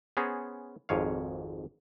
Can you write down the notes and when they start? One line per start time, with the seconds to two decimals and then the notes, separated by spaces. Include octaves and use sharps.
0.17 B3 C#4 G#4 C5 A#5
0.89 G#1 F2 G#2 C#5 F5